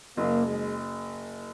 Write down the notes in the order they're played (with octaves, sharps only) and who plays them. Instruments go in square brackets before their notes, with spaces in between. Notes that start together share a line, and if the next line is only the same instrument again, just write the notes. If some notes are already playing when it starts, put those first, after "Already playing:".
[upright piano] F#1 [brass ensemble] A#3
[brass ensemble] G#3